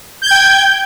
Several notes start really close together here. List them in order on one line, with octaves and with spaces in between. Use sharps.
G6 G#6 G5